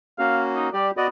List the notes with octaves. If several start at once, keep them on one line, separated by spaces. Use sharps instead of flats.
A#3 C#4 F#4 F5
D#4
G3 G4 D5
B3 F#4 D5 D#5